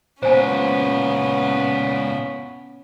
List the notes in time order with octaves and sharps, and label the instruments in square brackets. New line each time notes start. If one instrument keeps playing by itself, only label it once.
[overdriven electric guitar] C#2 A#2 [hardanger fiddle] B3 C#4 [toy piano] C5 G#5